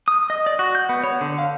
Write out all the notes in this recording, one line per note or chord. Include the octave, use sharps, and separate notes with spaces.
D#6
D#5
D5
F#4
G6
B3
C#5
D3
F5